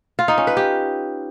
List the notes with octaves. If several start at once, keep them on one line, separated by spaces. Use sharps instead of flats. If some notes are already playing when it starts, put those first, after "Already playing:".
F4
D#4
C#4
B4
G4